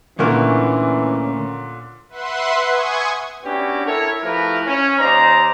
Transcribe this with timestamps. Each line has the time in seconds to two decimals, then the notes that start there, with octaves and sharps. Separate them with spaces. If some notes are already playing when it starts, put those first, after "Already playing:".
0.19 D2 A#2 D3 E3 A3 A#3 C#4
2.09 B4 E5 F#5 C6
2.69 G#5 C#6 D#6 G#6
3.44 B3 C#4 D4 E4 F#4 G4
3.86 E4 A4 A#4 C#5
4.22 F3 A3 E4 G4 A#4 B4
4.66 C#4
4.98 D#2 D#4 C5 D5 A#5